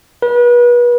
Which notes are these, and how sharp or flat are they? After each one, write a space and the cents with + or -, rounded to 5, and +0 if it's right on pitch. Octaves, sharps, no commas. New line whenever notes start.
B4 -35